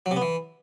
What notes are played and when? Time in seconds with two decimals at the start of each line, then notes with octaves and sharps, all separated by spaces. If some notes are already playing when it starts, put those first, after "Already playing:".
0.06 F#3
0.11 C3
0.16 B3
0.22 E3